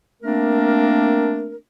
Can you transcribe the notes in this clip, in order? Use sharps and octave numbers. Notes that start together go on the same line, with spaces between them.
A3 A#3 C4 D4 A#4